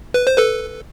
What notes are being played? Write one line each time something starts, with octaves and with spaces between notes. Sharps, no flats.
B4
C5
A4 B4